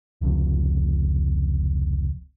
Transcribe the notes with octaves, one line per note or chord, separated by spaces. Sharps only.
F1 C#2 C3 F3